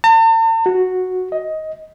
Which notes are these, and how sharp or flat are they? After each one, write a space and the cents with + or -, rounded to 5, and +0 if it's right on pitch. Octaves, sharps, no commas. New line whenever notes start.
A5 +45
F#4 -5
D#5 +15